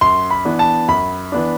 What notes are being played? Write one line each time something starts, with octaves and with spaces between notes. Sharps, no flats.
F#2 C6
B5
E3 B3 D4
A5
F#2 B5
E3 B3 D4